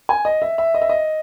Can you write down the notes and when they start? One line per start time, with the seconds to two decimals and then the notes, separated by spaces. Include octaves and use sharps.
0.09 G#5
0.25 D#5
0.42 E5
0.58 E5
0.74 D#5
0.82 E5
0.89 D#5